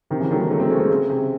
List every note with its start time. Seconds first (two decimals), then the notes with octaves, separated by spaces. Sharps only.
0.10 C3 D#3
0.20 C#3 E3
0.31 D#3 F#3
0.36 A3
0.40 E3 G#3
0.51 F#3 A3
0.60 G#3 C4
0.70 A3 C#4
0.80 G#3 C4
0.90 C#3
1.10 C3